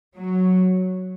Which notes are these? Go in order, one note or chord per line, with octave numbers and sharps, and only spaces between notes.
F#3